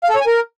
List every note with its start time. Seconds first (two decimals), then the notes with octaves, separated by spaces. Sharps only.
0.04 F5
0.09 A4
0.15 C#5
0.21 G#5
0.26 A#4